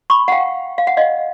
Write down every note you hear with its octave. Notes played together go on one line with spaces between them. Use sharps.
B5 C#6
F#5
F5 G5
F5
F#5
D#5 F5